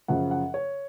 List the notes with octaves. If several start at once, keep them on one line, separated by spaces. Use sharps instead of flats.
F#2 C#3 F3 F#5
F#5
C#5